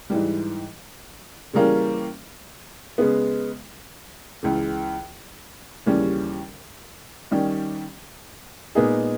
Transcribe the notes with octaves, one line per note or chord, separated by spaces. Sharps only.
G#2 E3 G3
C#3 E3 G3 A#3 C#4
C#3 G#3 B3
C#2 C#3 E3
D#2 C#3 E3 G3 C#4
D#3 G3 C#4 G4
A#2 G#3 B3 D#4 G#4